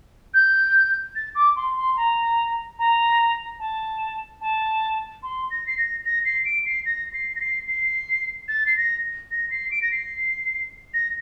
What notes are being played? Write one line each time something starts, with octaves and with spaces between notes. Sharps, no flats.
G6
A6
D6
C6
C6
A#5
A#5
A5
A5
C6
A#6
C7
A#6
A#6
C7
D7
C7
A#6
C7
A#6
C7
C7
A6
C7
A#6
A#6
C7
D7
A#6
C7
A#6